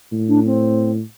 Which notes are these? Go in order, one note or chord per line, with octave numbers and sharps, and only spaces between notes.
A2
D4
C4